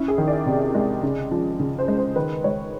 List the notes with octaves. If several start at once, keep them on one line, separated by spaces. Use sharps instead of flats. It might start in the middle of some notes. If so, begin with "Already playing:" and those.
Already playing: C#4 E4
G#4
D#3
D5
C3
G#3
C#3
F3
C#3
C5
G#3
C5
D#3 B4
G#3 C#5